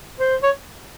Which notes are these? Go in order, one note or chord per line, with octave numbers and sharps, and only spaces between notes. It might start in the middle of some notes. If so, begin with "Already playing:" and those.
C5
C#5